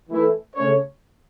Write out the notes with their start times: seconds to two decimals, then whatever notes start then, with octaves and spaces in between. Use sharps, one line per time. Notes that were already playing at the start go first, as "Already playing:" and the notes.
0.09 E3 A3 E4
0.55 C#3 A3 C#4 A4 C#5